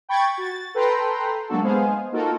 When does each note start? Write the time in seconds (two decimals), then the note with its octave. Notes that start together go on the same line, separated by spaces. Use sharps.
0.09 G5 B5 C#6 G#6 A6
0.38 F#4 A6
0.74 A4 B4 G5 A#5 C6
1.48 F#3 G#3 A#3 D4 F#4 A4
1.63 G#3 B3 G#4 C5 F5
2.12 A#3 D#4 F4 F#4 A4 A#4